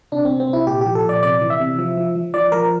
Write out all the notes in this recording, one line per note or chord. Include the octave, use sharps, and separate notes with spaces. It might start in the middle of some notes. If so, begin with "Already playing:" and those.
C3 D4
C4
C3
C4
C3 E4
A#2 G4
G4
F3
A4
A#2
D5
C3 D5
E3
E5
C3
F3
F3
F3
F3 D5
F3 A#4